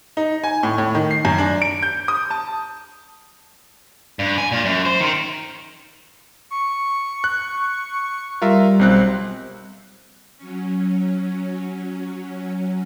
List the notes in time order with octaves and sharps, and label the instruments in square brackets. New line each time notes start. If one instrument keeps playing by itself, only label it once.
[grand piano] D#4
G#5
A2
A2
D#3
C7
F#2
D4
D7
G6
D#6
A5
[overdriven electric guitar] G2
G#5
A#2
F#2
C5
D#3
[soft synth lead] C#6
[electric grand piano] F#6
[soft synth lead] G3 [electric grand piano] F4 A#4 E5
[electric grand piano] B1 C4 F#6
[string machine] F#3 C#4